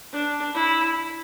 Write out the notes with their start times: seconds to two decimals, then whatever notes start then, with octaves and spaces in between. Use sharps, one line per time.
0.12 D4
0.54 E4